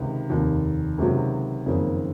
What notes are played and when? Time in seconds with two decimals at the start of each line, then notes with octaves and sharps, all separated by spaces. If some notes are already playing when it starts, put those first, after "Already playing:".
Already playing: C#2 C3 D#3
0.30 F1 D#2 D#3
0.98 C#2 C3 D#3 F#3
1.66 F#1 F2 D#3 A#3 C#4